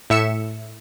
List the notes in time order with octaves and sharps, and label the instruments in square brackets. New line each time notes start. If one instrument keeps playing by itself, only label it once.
[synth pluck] A2 E5 C#7 E7